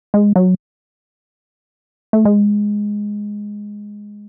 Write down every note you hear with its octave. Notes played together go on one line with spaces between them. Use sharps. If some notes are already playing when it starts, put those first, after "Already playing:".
G#3
F#3
A3
G#3